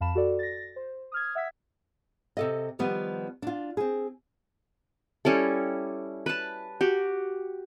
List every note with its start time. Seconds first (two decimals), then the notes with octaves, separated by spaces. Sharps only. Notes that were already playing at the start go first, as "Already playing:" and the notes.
0.01 F2 F5 A5 B5 E7
0.15 F#4 A4 D5
0.39 A6 A#6
0.76 C5
1.12 D#6 F6 G#6
1.35 E5 F#5 E6 G#6 B6
2.37 C3 A4 D#5
2.79 D#3 F3 G3 B3
3.42 D4 F4
3.77 C4 G#4
5.25 G3 C#4 E4 A4
6.26 B4 A5
6.81 F#4 G4